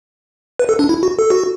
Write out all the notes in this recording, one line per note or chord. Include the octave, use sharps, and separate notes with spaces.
B4
A4
D4
E4
F#4
A4
F#4